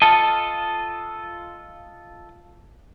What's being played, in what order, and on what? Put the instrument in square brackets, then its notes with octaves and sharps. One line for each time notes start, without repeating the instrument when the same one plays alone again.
[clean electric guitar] F4 A4 D#5 [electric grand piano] A5